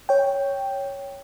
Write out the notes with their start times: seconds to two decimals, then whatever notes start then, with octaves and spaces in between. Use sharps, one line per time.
0.09 C#5 G5